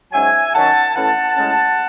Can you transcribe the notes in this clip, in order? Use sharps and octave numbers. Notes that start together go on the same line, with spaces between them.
G#2 F#3 C#4 E5 G#5
D#3 F#3 C#4 F#5 A5
A2 E3 A3 C#4 F#5 A5
A2 G#3 C#4